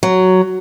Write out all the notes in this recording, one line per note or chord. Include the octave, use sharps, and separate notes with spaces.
F#3